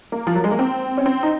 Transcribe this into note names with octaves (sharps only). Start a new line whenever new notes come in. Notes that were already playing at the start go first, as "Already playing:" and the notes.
A#3
F3
F#3
G#3
A#3
C4
C#4
C4
D#4